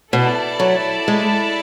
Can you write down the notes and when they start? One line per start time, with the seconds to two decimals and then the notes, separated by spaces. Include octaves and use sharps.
0.13 B2 E4 A4 D5 A5
0.60 F#3
1.08 G#3